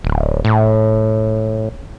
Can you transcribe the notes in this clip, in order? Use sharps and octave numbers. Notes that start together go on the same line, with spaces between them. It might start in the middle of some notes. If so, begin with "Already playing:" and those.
D1
A2